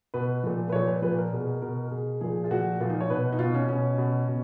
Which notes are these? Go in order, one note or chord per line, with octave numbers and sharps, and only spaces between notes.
B2 B4
A#2 F3
B4
A#2 F3 C#5
B4
A#2 F3 B4
A#4
B2 G#4
A#4
B2 A#4
A#4
B2 G#4
A#2 F3 G#4
F4
A#2 F3 F#4
A#2 F3 F4
D#4
C#5
B2 B4
D#4
B2 F4
C#4
B2 C#4
B2
B2